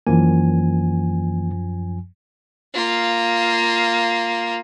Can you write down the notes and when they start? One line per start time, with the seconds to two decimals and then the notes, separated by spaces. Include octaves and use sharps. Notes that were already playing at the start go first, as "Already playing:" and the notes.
0.07 F#2 E3 F3 A#3 G#5
2.74 A#3 F4